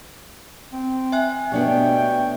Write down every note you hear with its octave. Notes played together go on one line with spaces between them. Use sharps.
C4
E5 G#5 F#6
B2 A3 B3 D4 G4 C#5 G5